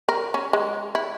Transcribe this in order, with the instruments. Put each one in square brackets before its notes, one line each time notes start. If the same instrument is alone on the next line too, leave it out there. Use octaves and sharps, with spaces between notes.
[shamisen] A#4
C#4
G#3
E4